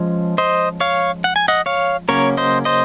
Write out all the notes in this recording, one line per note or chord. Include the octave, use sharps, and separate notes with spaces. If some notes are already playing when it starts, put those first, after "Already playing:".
Already playing: F3 G#3 C#4
C5 D#5
C#5 F5
F#5
G#5
D#5 F#5
C#5 F5
C#3 F#3 A#3 C#4 A#4 C#5
C5 D#5
C5 D#5